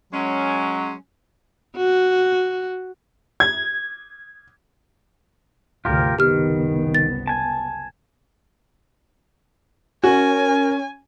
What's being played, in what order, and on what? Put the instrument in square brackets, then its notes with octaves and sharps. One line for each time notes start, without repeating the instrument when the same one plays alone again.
[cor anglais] F#3 [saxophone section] G#3 C#4
[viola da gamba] F#4
[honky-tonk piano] G#6
[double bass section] D2 G2 C3 [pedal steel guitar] F4 G4 A#4
[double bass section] F#1 C2 B3 [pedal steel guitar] D#3 [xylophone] G4 F6
[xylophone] A6
[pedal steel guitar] G#5 A5
[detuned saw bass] C#4 [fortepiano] F#4 [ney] A#4 [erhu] G#5